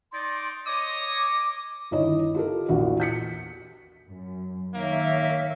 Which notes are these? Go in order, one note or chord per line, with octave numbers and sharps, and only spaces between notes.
D#4 D5 C6
C#5 D#5 D6 D#6
D6
G1 D#3 E4 C#5 D#5
F4 G4 A4 A#4
A#1 E2 F#4
G6 B6 C#7
F#2
D#3 A#3 C#5 E5